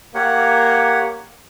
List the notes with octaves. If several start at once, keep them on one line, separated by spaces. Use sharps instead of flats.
A#3 G4 C#5 F#5